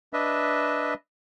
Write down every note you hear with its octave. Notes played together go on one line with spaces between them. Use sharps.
D4 B4 D#5 E5